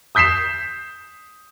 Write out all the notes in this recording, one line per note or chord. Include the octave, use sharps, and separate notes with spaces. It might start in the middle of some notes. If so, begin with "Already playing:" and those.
D#6 G6 B6 C7 E7